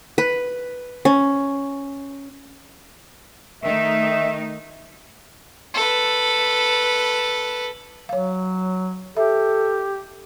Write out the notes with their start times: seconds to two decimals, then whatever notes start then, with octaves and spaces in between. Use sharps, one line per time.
0.18 B4
1.05 C#4
3.64 D#3 A3 D#4 E5
5.74 A4 B4
8.09 F#3 C#5 F5
9.17 G4 A4 E5